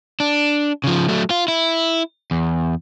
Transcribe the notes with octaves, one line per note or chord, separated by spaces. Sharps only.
D4
C#3 F3
F#3 A3
F4
E4
E2